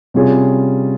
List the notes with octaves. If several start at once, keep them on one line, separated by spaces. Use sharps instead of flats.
C3 G3 C#4 F4 G#4